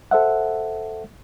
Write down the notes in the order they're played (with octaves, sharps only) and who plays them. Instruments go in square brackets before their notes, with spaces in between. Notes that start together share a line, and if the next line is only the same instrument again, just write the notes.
[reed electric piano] A4 C5 E5 F#5